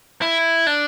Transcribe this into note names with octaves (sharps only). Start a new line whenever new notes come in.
E4
D4